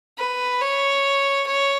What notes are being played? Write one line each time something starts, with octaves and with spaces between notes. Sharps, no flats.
B4
C#5
C#5